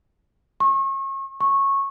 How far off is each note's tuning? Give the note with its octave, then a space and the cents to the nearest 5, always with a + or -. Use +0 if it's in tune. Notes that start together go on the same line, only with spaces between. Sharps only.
C#6 -35
C#6 -15